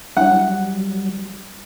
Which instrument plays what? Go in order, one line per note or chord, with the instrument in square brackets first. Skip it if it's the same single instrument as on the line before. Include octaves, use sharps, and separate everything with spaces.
[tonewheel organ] F#3 G3 [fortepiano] F#5